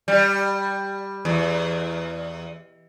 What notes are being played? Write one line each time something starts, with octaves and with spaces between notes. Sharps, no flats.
G3
E2